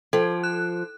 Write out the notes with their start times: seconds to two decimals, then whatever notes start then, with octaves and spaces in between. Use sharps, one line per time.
0.13 F3 A4
0.44 F#6